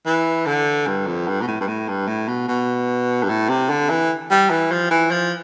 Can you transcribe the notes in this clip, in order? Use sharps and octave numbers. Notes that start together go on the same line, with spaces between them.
E3
D3
G2
F2
G2
B2
A2
G2
A2
G2
A2
B2
B2
G2
A2
C3
D3
E3
G3
E3
F3
E3
F3